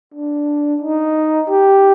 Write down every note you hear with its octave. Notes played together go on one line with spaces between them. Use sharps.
D4
D#4
G4